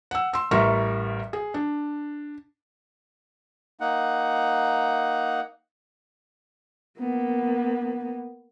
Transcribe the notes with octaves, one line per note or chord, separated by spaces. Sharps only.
F#5 E6
C6 E6
A1 G3 A#4 E5 C6 C#6
G#4
D4
A#3 D#4 F#5
A#3 B3